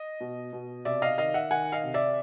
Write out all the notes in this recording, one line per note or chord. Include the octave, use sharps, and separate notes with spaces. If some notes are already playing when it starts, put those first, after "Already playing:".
Already playing: D#5
B2
B2
C3 D5 E5
D#5 F5
D#3 D#5 F5
E5 F#5
D#3 F#5 G#5
D#5 F5
C3
D5 E5